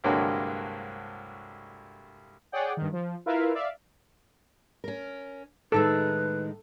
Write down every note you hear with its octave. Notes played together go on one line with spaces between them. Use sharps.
C2 G2 D3 F#3 G#3 A#3
G#4 C#5 D5 F#5 G5
G2 D#3
F3
E4 F4 A#4 B4 E5 F5
D5 E5 F5
C#4 A#4
A2 D#3 G#3 D#4 A4 B4